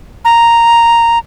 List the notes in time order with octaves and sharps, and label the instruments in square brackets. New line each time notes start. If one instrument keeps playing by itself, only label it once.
[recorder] A#5